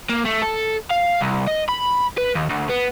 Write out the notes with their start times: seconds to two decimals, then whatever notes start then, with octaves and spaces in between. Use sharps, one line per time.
0.10 A#3
0.26 A3
0.43 A4
0.90 F5
1.21 C2
1.47 D#5
1.69 B5
2.18 B4
2.35 D#2
2.50 D2
2.69 B3